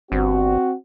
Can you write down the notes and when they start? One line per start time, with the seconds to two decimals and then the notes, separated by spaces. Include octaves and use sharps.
0.12 G1 C4 F#4